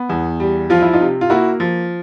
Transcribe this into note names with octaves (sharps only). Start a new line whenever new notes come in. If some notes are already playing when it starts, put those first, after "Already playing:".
Already playing: B3
E2
G3
F3 F4
E4
D#4 F4
C3
F4
A#3 E4 F#4
F3